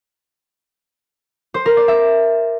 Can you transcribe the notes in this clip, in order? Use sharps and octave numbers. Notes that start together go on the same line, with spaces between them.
C5
A#4
D5
E5